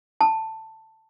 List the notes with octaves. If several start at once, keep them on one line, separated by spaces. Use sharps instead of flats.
A5